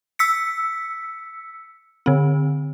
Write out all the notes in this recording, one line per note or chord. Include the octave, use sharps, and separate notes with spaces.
E6 B6 C#7
D3 C4